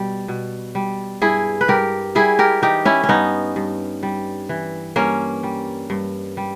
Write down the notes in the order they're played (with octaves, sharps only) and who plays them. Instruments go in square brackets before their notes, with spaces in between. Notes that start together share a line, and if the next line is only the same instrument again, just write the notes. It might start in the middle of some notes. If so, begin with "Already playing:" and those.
Already playing: [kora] B2 G3
B2
G3
G2 E4 G#4
B4
G2 G4 A#4
G3 E4 G#4
G4 A#4
E3 D#4 G4
C#4 E4
C#4
G2 B3 D#4
G2
G3
E3
G2 A#3 C#4
G3
G2
G3